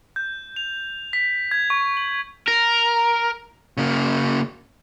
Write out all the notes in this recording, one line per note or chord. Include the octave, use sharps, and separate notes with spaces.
G6
F7
B6
G#6
C#6
F#7
A#4
C#3 A#3